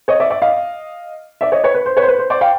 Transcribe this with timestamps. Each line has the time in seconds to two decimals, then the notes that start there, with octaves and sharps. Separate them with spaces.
0.08 C#5 D#5
0.20 D5 E5
0.30 D5 E5
0.42 D#5 F5
1.41 D5 E5
1.52 C#5 D#5
1.63 B4 C#5
1.74 B4
1.86 C5
1.97 B4 C#5
2.03 C5
2.08 B4
2.19 C5
2.30 C5 D5
2.41 F5 G5